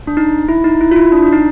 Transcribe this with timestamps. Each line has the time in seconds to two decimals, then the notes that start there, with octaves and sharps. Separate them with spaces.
0.07 D4
0.17 D#4
0.49 E4
0.64 D#4
0.81 E4
0.91 F4
0.96 E4
1.12 D4
1.23 D4
1.33 D#4